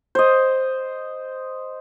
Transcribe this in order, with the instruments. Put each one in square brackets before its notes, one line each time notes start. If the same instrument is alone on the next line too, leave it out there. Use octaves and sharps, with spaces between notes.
[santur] C5 D#5